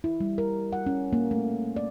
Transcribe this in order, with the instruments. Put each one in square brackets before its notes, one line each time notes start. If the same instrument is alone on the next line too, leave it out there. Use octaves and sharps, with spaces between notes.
[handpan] E4
G3
A#4
F#5
C#4
A#3
A3
D5